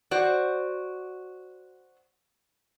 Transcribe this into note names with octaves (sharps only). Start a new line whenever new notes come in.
F#4 C5 D5